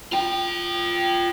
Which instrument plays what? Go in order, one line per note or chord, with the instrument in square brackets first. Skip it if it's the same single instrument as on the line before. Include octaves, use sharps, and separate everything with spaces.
[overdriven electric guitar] F4 G5